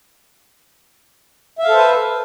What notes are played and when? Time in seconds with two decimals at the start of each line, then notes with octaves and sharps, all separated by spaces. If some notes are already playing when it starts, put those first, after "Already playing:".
1.59 E5
1.63 F5
1.68 A4
1.73 C5
1.77 B4